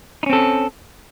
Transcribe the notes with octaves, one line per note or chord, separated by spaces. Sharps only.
C4 C#4 D#4 A4